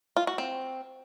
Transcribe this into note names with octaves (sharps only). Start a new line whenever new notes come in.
F4
F#4
C4